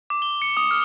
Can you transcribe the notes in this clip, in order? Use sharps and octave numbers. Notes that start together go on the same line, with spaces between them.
D6
G7
C#7
D#6
F6